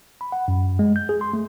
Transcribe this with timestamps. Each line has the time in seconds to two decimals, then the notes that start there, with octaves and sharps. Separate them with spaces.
0.21 B5
0.32 F#5
0.48 F#2
0.79 G#3
0.96 G6
1.09 G#4
1.21 C6
1.33 A3